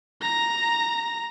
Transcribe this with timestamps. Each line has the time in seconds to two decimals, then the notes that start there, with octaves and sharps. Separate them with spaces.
0.22 A#5 A#6